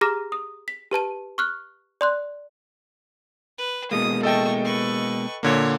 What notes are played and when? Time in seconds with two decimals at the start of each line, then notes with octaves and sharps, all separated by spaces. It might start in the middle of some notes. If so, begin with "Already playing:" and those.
0.01 G4 G#4 A#5 D6 F6 A#6
0.32 D#6
0.68 B6
0.91 G4 B4 A5 D#7
1.38 C#6 F6 F#6
2.01 D5 C6 F#6
3.58 B4
3.91 B2 G#3 A#3 D#6
4.23 A3 A4 D#5 G5 C#6
4.65 B4 C#6
5.43 A#2 D3 A#3 C#5